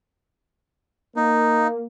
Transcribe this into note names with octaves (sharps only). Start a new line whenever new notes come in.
A#3 D#4